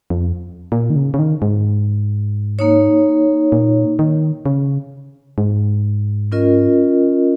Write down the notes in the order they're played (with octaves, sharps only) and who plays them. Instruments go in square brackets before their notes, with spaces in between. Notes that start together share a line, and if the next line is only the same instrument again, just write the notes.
[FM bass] F2
A#2
D#3
C#3
C#3
D#3
G#2
[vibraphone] A#3 D#4 C#5
[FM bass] A#2
D#3
C#3
G#2
[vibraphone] C#4 F4 A#4 D#5